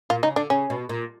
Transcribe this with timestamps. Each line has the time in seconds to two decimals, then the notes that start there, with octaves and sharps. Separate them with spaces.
0.10 A#2 F4
0.23 C#3 D#4
0.36 D3 D4
0.50 C#3 C#4
0.70 B2
0.89 A#2